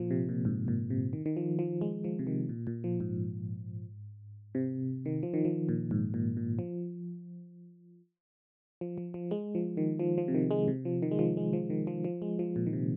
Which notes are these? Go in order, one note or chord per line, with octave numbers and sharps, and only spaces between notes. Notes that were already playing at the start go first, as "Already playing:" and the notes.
Already playing: A#2 F3
C3
A#2
G#2
A#2
C3
D#3
D#3
F3
F3
G#3
F3
C3
D#3
A#2
A#2
F3
G#2
C3
D#3
F3
D#3
F3
A#2
G#2
A#2
A#2
F3
F3
F3
F3
G#3
F3
D#3
F3
F3
C3
D#3
G#3
C3
F3
D#3
G#3
F3
G#3
F3
D#3
F3
F3
G#3
F3
A#2
D#3
C3